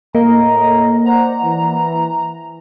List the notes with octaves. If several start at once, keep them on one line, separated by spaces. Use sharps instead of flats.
A2 A#3 D#5 A#5
C5 D5 F#5 A#5
E3